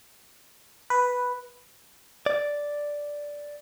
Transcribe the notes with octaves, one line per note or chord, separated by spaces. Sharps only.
B4
D5